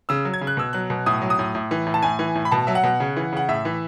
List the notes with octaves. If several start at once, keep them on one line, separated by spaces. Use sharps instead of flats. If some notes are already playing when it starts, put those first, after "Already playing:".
C#3 E6
F#3
G#6
C#3
F#6
B2 E6
F#3 F#6
B2
A2 D#6
F#3
D#6
A2
A2
E3
A2
A5
A2 G#5
E3
A2
B5
B2 A5
F#3 E5
F#5
B2
C#3
E3
C#3 F#5
A2 E5
E3